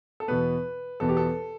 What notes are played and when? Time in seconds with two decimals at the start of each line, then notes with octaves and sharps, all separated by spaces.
0.20 A4
0.28 E2 B2 B3 B4
1.00 E2 B2 B3 A4
1.09 G4
1.17 A4